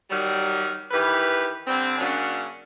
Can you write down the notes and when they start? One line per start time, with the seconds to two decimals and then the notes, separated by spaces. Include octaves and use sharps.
0.10 D#3 F#3 G3
0.91 D#3 E3 G4 B4
1.67 D3 G3 C4
1.98 C#3 F#3 A#3 C#4 D4